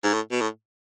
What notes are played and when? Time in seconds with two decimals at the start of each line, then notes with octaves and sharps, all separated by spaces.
0.04 G#2
0.14 A2
0.31 B2
0.41 A2